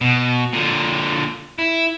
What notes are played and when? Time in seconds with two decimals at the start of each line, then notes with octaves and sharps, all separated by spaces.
0.01 B2
0.53 A#2 D3
1.59 E4